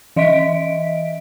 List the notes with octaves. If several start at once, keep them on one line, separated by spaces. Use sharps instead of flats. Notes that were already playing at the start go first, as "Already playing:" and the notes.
E3 D#5 E5 B6 D7